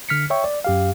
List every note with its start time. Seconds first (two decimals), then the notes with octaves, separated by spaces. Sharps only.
0.09 D3 F6 B6 C#7
0.30 C#5 E5 G5 C#6
0.44 D5
0.65 F#2 G4 F5